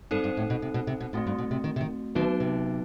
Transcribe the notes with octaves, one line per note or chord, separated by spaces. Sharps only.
G2 C4 D#4 A4 C5
G2
A2
B2
C3
B2
C3
B2
A2 A3 C4 F#4
G2
B2
C3
D#3
C3
D#3
D#3 F#3 B3 D#4 F#4 B4
C3